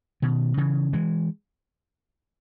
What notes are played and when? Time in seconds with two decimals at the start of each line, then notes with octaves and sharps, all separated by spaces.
0.22 B2 D#3
0.57 C#3 E3
0.93 E3 G#3